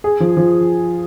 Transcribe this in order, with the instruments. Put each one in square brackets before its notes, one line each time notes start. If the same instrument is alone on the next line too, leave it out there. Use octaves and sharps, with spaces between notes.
[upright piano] G#4
F3
F3